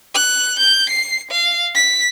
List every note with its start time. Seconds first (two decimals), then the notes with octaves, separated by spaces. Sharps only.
0.15 F#6
0.59 G6
0.90 C7
1.31 F5
1.75 B6